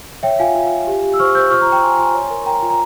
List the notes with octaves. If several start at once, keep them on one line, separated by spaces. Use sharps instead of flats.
C#5 E5 G5
F4 F5 G#5
F4
F4
G4
G4
E6
C5 C#6 F6
C5 E6 G6
F4 C#6 F6
A#5 C#6
F4
G5 A#5
F4 G#5 C6
F4 G#5 C6
C#5
A#4
A#4 G5 A#5
F4
A#5